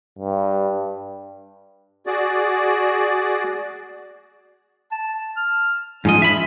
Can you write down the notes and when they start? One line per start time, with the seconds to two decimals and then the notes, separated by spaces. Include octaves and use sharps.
0.19 G2
2.06 F#4 G#4 D5
4.92 A5
5.37 F6
6.05 G#2 F3 C#4 D#5
6.22 E5 B5